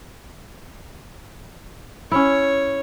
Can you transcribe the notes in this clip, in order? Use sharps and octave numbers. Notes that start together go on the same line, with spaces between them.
C#4 E4 C#5